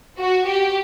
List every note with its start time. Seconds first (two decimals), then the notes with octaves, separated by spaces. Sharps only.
0.18 F#4
0.47 G4